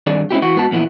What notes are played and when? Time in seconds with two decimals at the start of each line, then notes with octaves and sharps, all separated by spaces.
0.07 G2 D#3 C4 D4 G#4 D5
0.31 G#3 C4 C#4 E4 F4 G4
0.42 E3 F#4
0.56 G#2 B3 F#4 A5
0.71 F2 A#2 E3 B3 E4